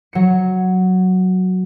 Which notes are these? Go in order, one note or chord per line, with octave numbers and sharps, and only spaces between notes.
F#3 C#7